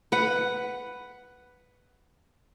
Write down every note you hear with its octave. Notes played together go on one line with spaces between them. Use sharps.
B4 F#5